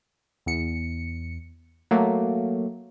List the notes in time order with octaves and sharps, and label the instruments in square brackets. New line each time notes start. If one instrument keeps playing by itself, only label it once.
[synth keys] E2 C#7
F#3 A3 A#3